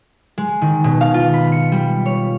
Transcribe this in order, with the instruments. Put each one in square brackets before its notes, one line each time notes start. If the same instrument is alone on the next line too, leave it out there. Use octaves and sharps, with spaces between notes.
[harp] G#3
D#3
B2
F5
F4
B5
C#7
G3
C#5